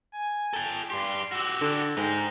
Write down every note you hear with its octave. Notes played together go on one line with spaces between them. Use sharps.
G#5
A4 G5
G2 G4 C6
F#4 G4 E6
D3
G#2 D#4 G#4 G5